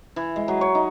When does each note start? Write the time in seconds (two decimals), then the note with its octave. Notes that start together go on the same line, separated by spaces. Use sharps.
0.16 E3
0.36 G#3
0.48 F#3
0.61 C#5
0.75 D#4